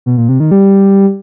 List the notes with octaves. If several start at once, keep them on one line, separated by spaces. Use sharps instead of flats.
B2
A#2
C3
D#3
G3